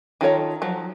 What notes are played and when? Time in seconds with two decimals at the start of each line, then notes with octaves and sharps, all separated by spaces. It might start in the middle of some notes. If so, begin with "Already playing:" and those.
0.21 D#3 F4 A4 C#5 A#5
0.62 F3 F#3